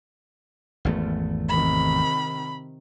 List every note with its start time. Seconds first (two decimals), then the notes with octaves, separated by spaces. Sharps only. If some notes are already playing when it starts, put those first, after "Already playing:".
0.85 G#1 E2 A3
1.49 C3 D#3 B5